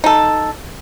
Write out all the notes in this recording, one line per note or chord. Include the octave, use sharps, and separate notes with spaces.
D#4 A4